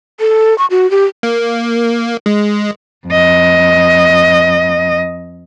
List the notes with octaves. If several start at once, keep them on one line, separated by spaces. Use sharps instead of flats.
A4
C#6
F#4
G4
A#3
G#3
F2 D#5